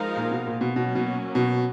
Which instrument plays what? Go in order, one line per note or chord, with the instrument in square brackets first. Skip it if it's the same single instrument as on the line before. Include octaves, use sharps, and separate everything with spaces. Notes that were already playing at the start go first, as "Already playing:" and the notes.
Already playing: [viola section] F3 G#3 D#4 A#4 F5
[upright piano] A#2
B2
A#2
B2
[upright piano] B2 [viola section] F#3 A#3 C#4
[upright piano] B2
B2